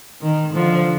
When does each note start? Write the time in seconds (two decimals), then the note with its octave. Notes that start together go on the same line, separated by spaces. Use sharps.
0.21 D#3
0.54 D3 F3